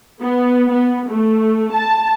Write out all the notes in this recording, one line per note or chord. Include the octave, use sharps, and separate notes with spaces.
B3
B3
A3
A5